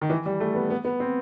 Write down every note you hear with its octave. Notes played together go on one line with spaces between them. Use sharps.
D#3
E3
G3
A3
B3
B3
B3
C4